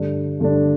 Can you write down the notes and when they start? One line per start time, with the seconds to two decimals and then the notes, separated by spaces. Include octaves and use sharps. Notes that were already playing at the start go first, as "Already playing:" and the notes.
Already playing: G2 D3 A3 D4
0.40 G2 D3 A3 D4